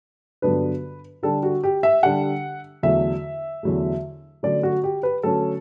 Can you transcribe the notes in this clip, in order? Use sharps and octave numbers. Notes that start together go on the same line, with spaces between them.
G2 D3 F#3 B3 D4 B4
D3 G3 D4 A4
F#4
G4
E5
D3 G3 D4 F#5
E2 D3 F#3 A3 E5
E2 D3 F#3 A3
D3 F#3 A3 C#4 D5
F#4
G4
B4
D3 F#3 A3 C#4 A4